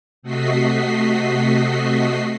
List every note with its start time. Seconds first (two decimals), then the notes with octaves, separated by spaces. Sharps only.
0.23 C3 A3 F#4 D#5 B6 C7